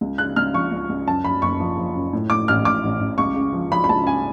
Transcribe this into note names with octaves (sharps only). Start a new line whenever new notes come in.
C#2
C#3 F#6
C#2 F6
F3 C#6
C#2
C#2
F#2 A5
F#2 B5
F#1 C#6
F3
F3
F#2
A2
A2 D6
A1 F6
A1 D6
A1
A1
C#2 C#6
C#3
F3
F3 B5
B5
C#2 A5
C#3 G#5